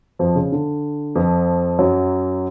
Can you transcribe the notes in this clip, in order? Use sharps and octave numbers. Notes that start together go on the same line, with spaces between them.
F2 F3
C#3
D3
F2 F3
F#2 F#3